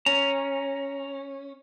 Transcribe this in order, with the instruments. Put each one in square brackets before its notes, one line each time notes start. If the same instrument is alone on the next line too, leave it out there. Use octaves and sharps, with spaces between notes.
[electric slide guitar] C#4 [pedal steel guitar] A#5